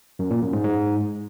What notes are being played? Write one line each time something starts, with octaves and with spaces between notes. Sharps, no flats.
F#2
A#2
F#2
G#2
G#2